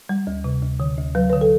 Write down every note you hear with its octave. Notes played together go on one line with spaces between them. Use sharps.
G3
D2
C3
D2
D3
D2
F#3 B4
D3 B4
A4